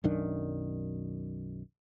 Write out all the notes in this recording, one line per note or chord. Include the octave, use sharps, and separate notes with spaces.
B1 F#2 D#3 D4